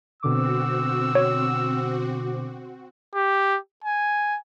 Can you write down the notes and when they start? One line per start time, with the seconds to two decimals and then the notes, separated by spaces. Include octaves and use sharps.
0.23 B2 D3 C4 F#4 D6 E6
1.15 C#5
3.15 G4
3.84 G#5